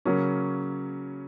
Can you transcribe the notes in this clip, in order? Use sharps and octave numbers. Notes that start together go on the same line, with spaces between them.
C#3 F#3 A#3 C#4